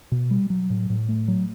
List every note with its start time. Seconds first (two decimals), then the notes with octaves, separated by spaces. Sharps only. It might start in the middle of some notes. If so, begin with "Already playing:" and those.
0.12 B2
0.31 G3
0.50 F#3
0.70 A2
0.90 A2
1.09 A3
1.28 F#3